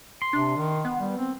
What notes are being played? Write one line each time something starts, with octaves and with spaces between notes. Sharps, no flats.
C6
C3 D4
D#3
B3
G3
C4